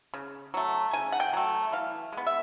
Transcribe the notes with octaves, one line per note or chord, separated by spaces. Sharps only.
C#3
F#3 A3
C#3 G#5
F#5
G5
F#3 A3
E3 F5
G#3
B3
E5